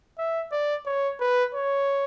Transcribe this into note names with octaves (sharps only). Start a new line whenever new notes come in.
E5
D5
C#5
B4
C#5